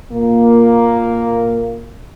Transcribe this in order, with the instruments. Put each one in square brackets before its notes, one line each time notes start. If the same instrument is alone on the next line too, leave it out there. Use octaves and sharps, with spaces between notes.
[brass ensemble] A#2 A#3